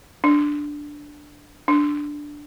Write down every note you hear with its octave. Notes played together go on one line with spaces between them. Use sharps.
D4
D4